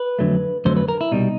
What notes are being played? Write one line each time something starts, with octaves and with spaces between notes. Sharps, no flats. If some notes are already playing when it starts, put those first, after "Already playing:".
Already playing: B4
F2 D3 F#3 A3
F2 D3 F#3 A3 C5
B4
A#4
E4
C2 B2 G3 D#4